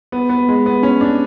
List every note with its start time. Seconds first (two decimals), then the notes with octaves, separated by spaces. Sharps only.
0.12 B3
0.29 B3
0.48 G#3
0.66 B3
0.83 C#4
1.01 D4